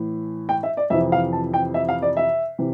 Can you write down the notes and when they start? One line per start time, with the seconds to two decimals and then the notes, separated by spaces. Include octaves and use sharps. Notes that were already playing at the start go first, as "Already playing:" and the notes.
Already playing: A2 E3
0.49 G5
0.63 E5
0.77 D5
0.90 F2 C3 E3 E5
1.12 F5
1.32 A5
1.54 G5
1.74 E5
1.89 F5
2.02 D5
2.17 E5
2.59 C3 E3